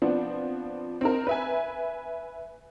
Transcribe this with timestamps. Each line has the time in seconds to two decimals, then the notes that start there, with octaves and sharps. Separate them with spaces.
0.02 F3 B3 C4 D4
1.01 C4 D#4 A#4
1.27 B4 E5 G#5